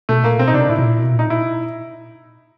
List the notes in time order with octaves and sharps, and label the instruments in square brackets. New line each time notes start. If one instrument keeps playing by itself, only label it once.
[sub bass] B2 [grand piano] A3
[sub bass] A#2 [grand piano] A#3
[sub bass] B2 [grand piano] C4
[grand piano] D#4
[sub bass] C3 [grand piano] D4
[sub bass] A#2 [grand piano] E4
[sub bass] B2
A#2
B2
[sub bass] A#2 [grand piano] D#4
[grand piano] E4